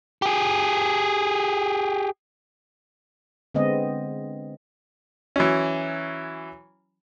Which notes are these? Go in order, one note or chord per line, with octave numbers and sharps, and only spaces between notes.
G4 G#4
D3 G#3 B3 C4 D#5
E3 F#3 C#4